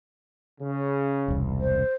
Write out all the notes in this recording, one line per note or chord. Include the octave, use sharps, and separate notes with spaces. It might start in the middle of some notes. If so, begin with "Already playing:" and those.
C#3
E1 C2
C5